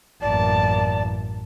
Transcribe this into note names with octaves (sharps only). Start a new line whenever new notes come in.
A1 F#2 A#3 D5 A5